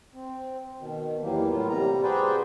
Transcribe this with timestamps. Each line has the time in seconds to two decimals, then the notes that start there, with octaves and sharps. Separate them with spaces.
0.14 C4
0.80 B2 D#3
1.22 E2 E3 F#3 G3 A#3
1.50 A2 A#3 B3 F4
1.68 C3 G3 A#5
2.03 F#4 G#4 B4 C5 D5 G5